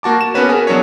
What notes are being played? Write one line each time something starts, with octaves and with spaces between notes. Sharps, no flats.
A#3 F#4 A5 D6
E7
B3 C#4 F#4 A#4 B4 C#5
G#4 A#4 G#5
E3 F#3 B3 D4 C#5